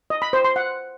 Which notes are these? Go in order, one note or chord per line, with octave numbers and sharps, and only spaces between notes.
D#5
B5
C5
C6
F#5